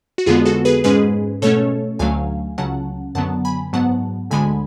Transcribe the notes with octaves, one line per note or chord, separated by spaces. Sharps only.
F#4
F2 D3 G#3 B3 F4 G#4
F#4 A4
G#4 B4
G#2 G#3 C#4 G#4 B4
B2 A3 C#4 A4 C#5
D2 D3 F#3 A3 F5 G#5
C#2 C#3 F#3 C#4 F#5 A5
F#2 D3 F#3 B3 F#5 A5
G#5 B5
G#2 F#3 B3 F#5 A5
D2 D3 G#3 G#5 B5